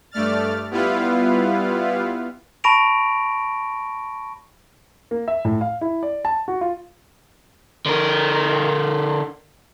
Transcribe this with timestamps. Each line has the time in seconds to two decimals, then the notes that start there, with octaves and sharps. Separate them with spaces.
0.11 G2 A3 D5 F6 A6
0.71 G3 B3 E4 F4 B4 F5
2.64 A5 B5 C#6 A#6 D7 F7
5.11 A#3
5.28 E5
5.45 A2
5.61 F5
5.81 E4
6.03 D5
6.25 A5
6.48 F#4
6.61 F4
7.86 D3 A#4